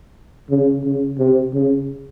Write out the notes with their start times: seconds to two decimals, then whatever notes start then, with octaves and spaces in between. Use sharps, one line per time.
0.50 C#3
0.84 C#3
1.19 C3
1.54 C#3